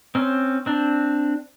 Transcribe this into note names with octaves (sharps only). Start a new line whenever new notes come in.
C4 C#4
C4 D4